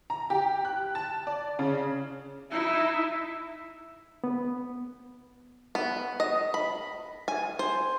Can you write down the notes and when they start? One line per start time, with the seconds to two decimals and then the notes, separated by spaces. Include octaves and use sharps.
0.10 A#5
0.30 G4
0.65 F#6
0.95 A5
1.27 D5
1.59 C#3
2.51 D#4 E4 E5
4.24 B3
5.75 B3
6.20 D#5
6.54 B5
7.28 G#5
7.59 C5